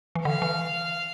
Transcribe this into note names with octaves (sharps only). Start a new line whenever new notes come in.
E3
D3 F5
E3